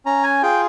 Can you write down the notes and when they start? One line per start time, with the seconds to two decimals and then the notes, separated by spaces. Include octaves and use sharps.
0.06 C#4 A#5
0.23 G#5
0.42 F4 G#4 G5